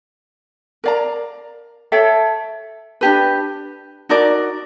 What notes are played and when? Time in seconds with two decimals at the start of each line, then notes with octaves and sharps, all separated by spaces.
0.84 A#4 D5 F5 A#5
1.92 A4 C#5 E5 G5
3.01 D4 G4 B4
4.09 D#4 F#4 A#4 D5